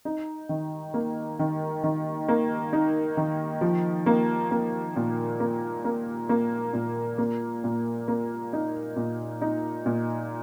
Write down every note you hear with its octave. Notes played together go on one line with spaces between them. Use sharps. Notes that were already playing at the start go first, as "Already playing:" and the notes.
D#4
D#3
A#3
D#3
D#3
A#3
D#4
D#3
F3
A#3
A#3
A#2
A#3
A#3
A#3
A#2
A#3
A#2
A#3
D#4
A#2
D#4
A#2